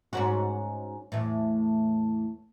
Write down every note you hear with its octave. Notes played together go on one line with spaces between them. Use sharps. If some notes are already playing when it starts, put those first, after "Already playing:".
G#2 C#4 F#4
E2 A2